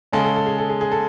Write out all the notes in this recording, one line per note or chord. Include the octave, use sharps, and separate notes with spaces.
C#3 G#3 C#4 A4
A4
A4
G#4
A4
G#4
G#4
A4